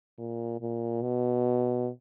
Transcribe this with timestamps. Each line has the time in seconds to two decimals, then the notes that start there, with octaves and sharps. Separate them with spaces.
0.18 A#2
0.61 A#2
1.02 B2